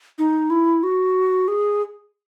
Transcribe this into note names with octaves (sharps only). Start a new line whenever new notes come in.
D#4
E4
F#4
G#4